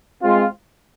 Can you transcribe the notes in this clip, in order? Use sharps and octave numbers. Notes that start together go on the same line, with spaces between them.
G#3 C4 F4